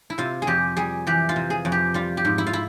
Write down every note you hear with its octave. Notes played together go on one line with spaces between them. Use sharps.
E4
C3 F4
G#4
F2 G4
G3 G#4
E3 G4
F4
C3
G#4
F2
G4
G3 F4
G4
G#2
E4
F4
E4